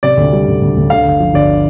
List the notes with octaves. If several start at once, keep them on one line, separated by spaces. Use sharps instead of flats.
C3 D5
D2
G3
D2
D2
D2
D3 F5
G1
F3
G1 D5